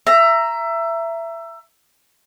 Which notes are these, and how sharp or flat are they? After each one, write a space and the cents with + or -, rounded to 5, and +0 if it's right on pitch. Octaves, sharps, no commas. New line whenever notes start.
E5 +20 A#5 +0